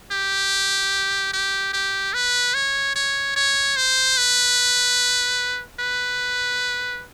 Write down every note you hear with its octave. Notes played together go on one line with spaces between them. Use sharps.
G4
G4
G4
B4
C#5
C#5
C#5
C5
B4
B4